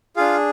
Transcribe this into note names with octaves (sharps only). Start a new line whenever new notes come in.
D4 F4 G#4 F5